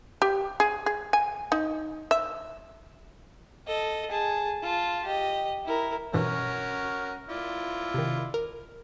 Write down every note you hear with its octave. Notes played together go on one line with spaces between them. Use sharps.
G4
G#4
G#4
G#5
D#4
E5
A4 D#5
G#4 A5
F4 A5
G4 D#5
E4 A#4
G2 B2 E3 C#4 F#4 A#4
E4 F4 D5
C3 D#3
A#4